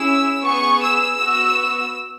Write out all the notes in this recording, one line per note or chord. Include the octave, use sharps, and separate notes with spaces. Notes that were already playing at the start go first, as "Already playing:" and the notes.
Already playing: C#4 E4 G#4 E6
B3 G#4 C#6
E6
B3 F#4